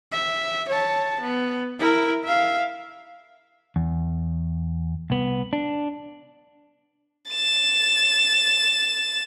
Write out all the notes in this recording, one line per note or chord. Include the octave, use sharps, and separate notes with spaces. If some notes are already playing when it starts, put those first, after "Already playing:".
E5
C#5 A5
B3
E4 A#4
E5 F5
E2
C2 B3
D4
A6 E7